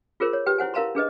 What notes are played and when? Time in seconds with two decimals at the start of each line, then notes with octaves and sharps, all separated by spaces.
0.20 F4 G#4 A#4 C5
0.33 C#5
0.46 G4 B4 G5
0.58 E4 C5 F#5 G#5
0.74 E4 A#4 F5 A5 A#5 C6
0.95 D4 G#4 B4 D#5